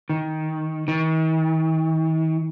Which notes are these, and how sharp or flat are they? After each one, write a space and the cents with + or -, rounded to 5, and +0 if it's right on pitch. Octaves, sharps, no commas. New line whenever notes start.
D#3 +15
D#3 +45